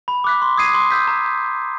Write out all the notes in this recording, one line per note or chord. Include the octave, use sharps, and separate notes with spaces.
B5
D6 F#6 B6
C6
D#6 G#6 C7 D#7
C6
E6 G6 B6
A#5